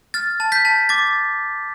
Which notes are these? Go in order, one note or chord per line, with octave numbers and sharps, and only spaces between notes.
F6 A6
A5
G6 B6
A5
D6 A6